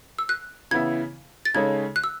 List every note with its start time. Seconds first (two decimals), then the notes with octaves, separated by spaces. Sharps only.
0.19 E6
0.29 F#6
0.71 C#3 E3 B3 E4 G#6
1.45 A6
1.54 C#3 G#3 D#4 A4 C#5 G#6
1.96 F#6
2.04 E6